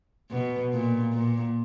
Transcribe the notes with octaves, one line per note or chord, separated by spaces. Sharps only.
B2
A#2
A#2